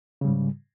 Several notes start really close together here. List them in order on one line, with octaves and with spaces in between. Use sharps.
C#3 G3 G#2